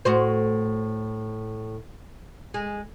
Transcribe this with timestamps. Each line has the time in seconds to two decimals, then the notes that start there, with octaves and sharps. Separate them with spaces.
0.05 A2 F#4 C5
2.54 G#3